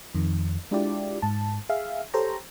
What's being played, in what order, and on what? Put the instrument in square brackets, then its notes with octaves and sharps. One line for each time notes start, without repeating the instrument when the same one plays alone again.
[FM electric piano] F2 D#3
G#3 D4 E4 F4 G4 D5
G#2 A5
G#4 E5 F5
G4 A4 C5 C#5 A#5